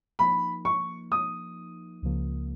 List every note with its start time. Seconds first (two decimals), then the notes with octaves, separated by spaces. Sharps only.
0.19 F3 A#3 D#4 B5
0.65 C#6
1.12 D#6
2.02 C#2 C#3 F3 A#3